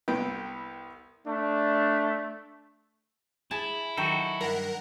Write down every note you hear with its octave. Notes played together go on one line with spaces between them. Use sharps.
C2 B3 G5
A3 D4
E4 G#4 A5
D#3 F#3 F#4 A4 G5
G2 A#4 F#5 A#5